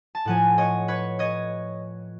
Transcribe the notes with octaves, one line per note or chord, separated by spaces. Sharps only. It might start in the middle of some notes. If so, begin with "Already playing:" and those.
A5
A2 F3 F#5 G#5
C#5 D#5
B4 C#5
C#5 D#5